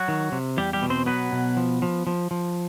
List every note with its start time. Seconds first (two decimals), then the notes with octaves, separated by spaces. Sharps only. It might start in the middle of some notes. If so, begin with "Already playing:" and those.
Already playing: F#3 F#4
0.08 D#3
0.32 C3
0.57 E2 G3 G4
0.73 G3 G4
0.82 B2
0.90 C4 C5
1.06 F#3 B3 B4
1.32 B2
1.57 F3
1.82 F3
2.07 F3
2.31 F3